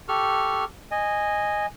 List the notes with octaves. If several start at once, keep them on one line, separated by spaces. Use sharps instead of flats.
G4 A4 C#6 F6
D#5 G#5